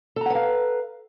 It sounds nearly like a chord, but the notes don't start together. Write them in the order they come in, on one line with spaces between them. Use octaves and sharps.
A4 A#5 F#5 B4 F5